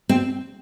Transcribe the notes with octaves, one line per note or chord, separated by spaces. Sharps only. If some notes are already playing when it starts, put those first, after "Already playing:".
C4